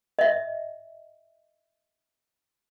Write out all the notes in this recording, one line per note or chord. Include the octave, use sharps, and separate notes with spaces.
D#5 E5